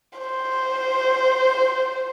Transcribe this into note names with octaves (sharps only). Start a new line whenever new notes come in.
C5